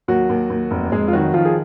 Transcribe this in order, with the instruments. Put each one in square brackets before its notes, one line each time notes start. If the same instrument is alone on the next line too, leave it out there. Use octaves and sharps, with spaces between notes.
[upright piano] D#2 F#3 F#4
D#2
D#2
F1
F1 G#3 G#4
F4
D#3 F#3 F#4
D#3 F3 F4
G#4